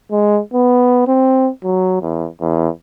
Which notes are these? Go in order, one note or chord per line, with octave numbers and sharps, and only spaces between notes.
G#3
B3
C4
F#3
E2
E2